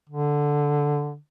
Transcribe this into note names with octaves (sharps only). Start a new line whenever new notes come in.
D3